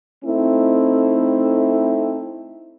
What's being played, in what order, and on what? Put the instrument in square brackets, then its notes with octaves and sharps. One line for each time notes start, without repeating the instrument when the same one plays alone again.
[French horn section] A3 C4 D#4 E4